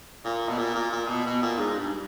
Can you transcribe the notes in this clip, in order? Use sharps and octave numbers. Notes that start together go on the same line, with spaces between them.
A#2
B2
A#2
A#2
A#2
B2
B2
A#2
G#2
G2